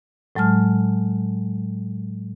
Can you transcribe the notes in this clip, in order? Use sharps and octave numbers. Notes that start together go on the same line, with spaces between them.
A2 F#3 G#3 A5 F6